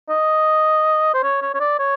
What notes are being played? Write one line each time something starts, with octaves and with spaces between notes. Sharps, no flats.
D#5
C5
C#5
C#5
C#5
D5
C#5